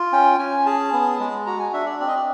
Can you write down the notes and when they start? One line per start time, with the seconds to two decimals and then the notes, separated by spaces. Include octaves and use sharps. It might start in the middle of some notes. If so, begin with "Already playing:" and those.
Already playing: F4
0.13 C#4 G5
0.39 C#4 G#5
0.66 G#4 A5
0.93 B3
1.20 G#3
1.46 F#4 A#5
1.60 G#5
1.73 D4 E5
1.86 D5
2.00 C4 D5
2.07 D#5
2.15 D5